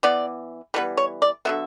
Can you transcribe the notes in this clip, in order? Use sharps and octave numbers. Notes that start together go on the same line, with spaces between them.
E3 B3 D5
E3 G3 B3 B4
C#5
D5
D3 F#3 B3 E5